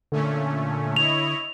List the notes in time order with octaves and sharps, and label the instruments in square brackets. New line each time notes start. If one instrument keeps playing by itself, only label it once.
[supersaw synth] A#2 A3 C#4 [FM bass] D3
[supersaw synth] E4 C#5 D#5 [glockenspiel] F7